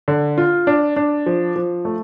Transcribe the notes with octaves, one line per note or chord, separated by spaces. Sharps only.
D3
F4
D4
D4
F3
F3
A3